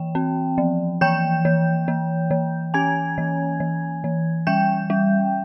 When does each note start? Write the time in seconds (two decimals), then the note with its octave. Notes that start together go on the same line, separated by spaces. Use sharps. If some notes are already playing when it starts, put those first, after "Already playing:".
Already playing: E3 G5
0.15 C4
0.58 F3
1.01 E3 G5 G6
1.45 E3
1.88 E3
2.31 E3
2.74 C#4 G#5 G#6
3.18 E3
3.60 E3
4.04 E3
4.47 G3 G5 G6
4.90 G3